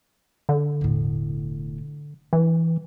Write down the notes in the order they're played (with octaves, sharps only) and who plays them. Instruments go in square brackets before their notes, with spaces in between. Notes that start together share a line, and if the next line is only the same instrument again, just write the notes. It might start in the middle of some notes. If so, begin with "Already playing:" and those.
[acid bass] D3
[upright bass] E1 A2
[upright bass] D3 [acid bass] E3